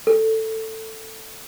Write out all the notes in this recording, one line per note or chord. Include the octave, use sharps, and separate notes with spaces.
A4